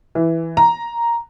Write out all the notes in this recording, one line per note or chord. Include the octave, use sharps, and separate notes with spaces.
E3
A#5